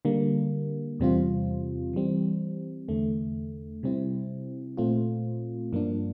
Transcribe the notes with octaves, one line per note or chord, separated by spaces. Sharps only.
D3 G3 A#3
E2 C3 G3 C4 F4
E3 G3 C4
E2 D3 A3
C3 G3 C4 E4
A#2 A3 C4 F4
G2 F3 A#3 D4